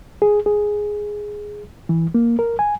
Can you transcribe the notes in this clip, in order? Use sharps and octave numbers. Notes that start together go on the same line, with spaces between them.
G#4
G#4
E3
A#3
A#4
G#5